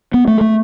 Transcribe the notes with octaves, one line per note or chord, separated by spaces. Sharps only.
B3
A3
A3